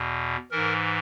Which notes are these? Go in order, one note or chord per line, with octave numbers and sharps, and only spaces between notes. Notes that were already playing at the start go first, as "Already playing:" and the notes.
Already playing: E2 B2
G#2 E3 A#4